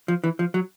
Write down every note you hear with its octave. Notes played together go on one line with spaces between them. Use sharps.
F3
E3
F3
F#3